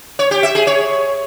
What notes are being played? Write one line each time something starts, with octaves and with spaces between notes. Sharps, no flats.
C#5
G4
E5
G#4
C#5